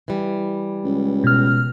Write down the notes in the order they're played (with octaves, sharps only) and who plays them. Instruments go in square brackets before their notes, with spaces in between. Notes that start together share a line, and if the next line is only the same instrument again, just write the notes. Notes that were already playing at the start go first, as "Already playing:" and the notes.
[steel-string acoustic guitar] E3 G3
[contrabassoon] C#2
[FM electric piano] B2 F6